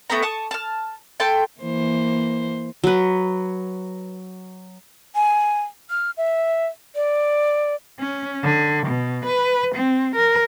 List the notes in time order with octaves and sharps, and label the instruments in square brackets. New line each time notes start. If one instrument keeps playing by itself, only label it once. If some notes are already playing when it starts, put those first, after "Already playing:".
[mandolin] A3 B3 G5 A#5
A5 C#6 D#6
A5 F6
A3 G5 A5 C6
[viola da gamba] E3 A#3 C5
[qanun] F#3 B4
[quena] G#5
F6
E5
D5
[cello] C#4
D3
B2
B4
C4
A#4